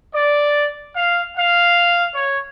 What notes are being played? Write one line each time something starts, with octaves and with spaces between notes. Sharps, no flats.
D5
F5
F5
C#5